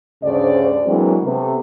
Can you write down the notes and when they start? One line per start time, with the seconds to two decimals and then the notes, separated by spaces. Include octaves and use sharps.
0.23 D2 G2 C#3 C5 D5
0.85 E3 F#3 G#3 A#3 C4 D4
1.23 C3 A3 B3